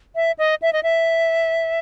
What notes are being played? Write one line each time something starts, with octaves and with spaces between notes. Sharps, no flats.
E5
D#5
E5
D#5
E5